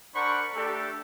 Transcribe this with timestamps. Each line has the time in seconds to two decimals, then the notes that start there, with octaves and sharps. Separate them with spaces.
0.15 D4 A#4 C5 F#5 B5 C#6
0.54 A3 D4 G4 A4